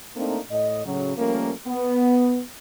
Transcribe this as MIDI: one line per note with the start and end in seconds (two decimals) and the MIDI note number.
0.16 0.39 57
0.16 0.39 58
0.16 0.39 60
0.16 0.39 62
0.16 0.39 63
0.16 0.39 69
0.51 0.83 45
0.51 0.83 75
0.86 1.13 45
0.86 1.13 49
0.86 1.13 54
1.17 1.51 53
1.17 1.51 55
1.17 1.51 57
1.17 1.51 58
1.17 1.51 61
1.17 1.51 70
1.67 2.42 59